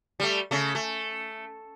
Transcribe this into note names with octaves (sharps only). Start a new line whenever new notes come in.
G3 A3
C#3 A3
A3